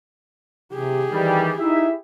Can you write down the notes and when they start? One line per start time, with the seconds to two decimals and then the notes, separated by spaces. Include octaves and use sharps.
0.73 C3 G4 G#4
1.12 D#3 E3 G3
1.58 D#4 E4 E5